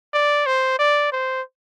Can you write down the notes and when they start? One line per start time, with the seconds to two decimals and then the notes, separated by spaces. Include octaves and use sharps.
0.14 D5
0.46 C5
0.79 D5
1.12 C5